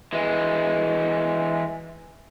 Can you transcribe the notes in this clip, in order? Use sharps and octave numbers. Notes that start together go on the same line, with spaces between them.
E3 G#3